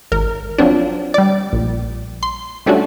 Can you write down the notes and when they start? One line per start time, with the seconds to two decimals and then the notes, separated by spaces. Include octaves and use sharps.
0.12 G#1 A#4
0.58 F3 F#3 C4 D4
1.14 G3 D5
1.53 A#1
2.23 C6
2.66 G3 A3 C#4 D4 F#4